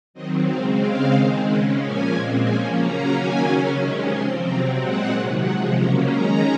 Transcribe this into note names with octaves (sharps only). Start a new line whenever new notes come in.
D#3 F#3 C4 D#5
C#3 G#3 C4 F5
C#3 G#3 C4 F5
D#3 G#3 C4
C#3 G#3 C#4 F#5
A#2 F3 A#3 C#4 G#5
A#2 G#3 C4
F3 A#3 C#4 G#5
C#3 F#3 A#3 C#4 A#5
D#3 F#3 A#3 C#4 G#5
C#3 F#3 C#4
C3 D#3 G#3 C#4
F3 C4 C6
C3 F#3 C4 A#5
A#2 G#3 C4 F#5
C3 D#3 F#3
C3 F3 G#3 F#5
C#3 F#3 A#3 C#4 A#5
D#3 G#3 C#4 A#5